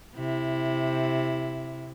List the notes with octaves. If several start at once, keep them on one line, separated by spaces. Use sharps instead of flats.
C3 E4